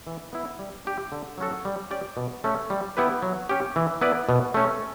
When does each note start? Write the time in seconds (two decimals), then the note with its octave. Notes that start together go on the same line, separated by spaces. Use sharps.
0.07 E3
0.33 B3 E4
0.59 G3
0.85 D4 G4
1.12 D3
1.38 F#3 C#4 F#4 A4
1.65 G3
1.91 C#4 G4 D5
2.17 B2
2.44 A3 C#4
2.70 G3
2.97 B3 E4 G4 B4
3.22 F#3
3.49 C#4 G4
3.76 E3
4.01 B3 E4 B4 D5
4.29 B2
4.54 A3 C#4